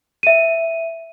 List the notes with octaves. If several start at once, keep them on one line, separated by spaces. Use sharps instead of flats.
E5 D#7